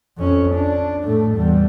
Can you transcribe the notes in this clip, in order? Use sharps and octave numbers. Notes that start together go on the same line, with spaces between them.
F2 C#4
D4
A2 A3
E2 G3